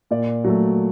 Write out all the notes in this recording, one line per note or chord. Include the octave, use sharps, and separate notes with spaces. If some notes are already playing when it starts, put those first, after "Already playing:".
A#2 D5
F#3 A3